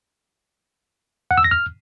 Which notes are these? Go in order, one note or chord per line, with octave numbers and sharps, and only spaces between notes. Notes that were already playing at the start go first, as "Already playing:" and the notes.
F#5
E6
A#6
F6